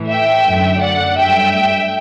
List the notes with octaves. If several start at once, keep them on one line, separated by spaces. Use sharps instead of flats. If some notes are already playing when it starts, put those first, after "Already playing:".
Already playing: A2 E3 A3
E5 G5
F#2 D3 F#3 A3
D5 F#5
G2 F#3 A3 E5 G5